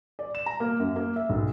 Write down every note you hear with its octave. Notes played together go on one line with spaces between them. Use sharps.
D5
E7
A#5
A#3
F#2
A#3
E5
B1